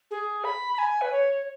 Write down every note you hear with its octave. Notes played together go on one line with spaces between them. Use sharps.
G#4
B5
B5
G#5
B4
C#5